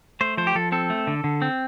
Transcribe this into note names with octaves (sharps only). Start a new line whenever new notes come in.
A3 C5
F3 C5
G4
F3 A4
C4 A4
A3
D3
D3
C4